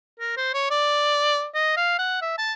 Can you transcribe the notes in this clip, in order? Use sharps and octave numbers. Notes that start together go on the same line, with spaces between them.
A#4
C5
C#5
D5
D#5
F5
F#5
E5
A5